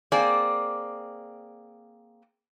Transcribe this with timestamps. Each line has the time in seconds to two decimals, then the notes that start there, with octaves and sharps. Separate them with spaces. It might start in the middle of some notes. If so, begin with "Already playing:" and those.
0.12 A#3 C4 G#4 D5